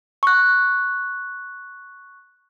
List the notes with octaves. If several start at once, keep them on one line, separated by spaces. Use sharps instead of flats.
C#6 F#6